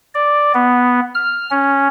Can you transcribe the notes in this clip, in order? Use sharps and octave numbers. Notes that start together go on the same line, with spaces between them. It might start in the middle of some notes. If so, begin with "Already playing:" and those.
D5
B3
F6
C#4